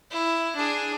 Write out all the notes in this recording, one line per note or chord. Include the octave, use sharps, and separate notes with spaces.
E4
D4 G#4